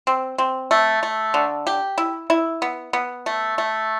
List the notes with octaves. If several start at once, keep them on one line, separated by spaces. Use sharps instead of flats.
C4
C4
A3
A3
D3
G4
E4
E4
B3
B3
A3
A3